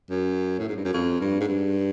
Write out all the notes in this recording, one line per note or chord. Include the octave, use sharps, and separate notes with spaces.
F#2
A2
G#2
G2
F#2
F2
G2
G#2
G2